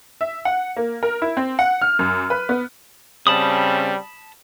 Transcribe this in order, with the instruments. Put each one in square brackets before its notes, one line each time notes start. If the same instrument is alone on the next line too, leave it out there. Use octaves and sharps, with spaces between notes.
[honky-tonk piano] E5
F#5
A#3
A#4
E4
C4
F#5
F6
F#2
B4
B3
[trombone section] C#3 G3 C4 [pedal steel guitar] A5 B5 D#6